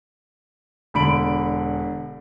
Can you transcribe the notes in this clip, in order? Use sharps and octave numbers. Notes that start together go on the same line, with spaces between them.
E1 D3 B5 D7 F#7